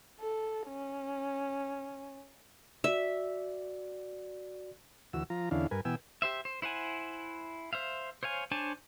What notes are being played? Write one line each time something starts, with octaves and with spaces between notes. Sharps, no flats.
A4
C#4
F#4 D5 E5
D2 E3 F#4 E6
F3 F4 A#5
E2 D3 C#4 D4 E4 F5
G2 A#4 B4 G#5
B2 E3 B3 G5 G#5 E6
G4 C5 E5
C5
E4 C5 F#5 G#5
C5 E5 F5
C5 C#5 F5 G#5
D4 C5 C#5 G#5 A5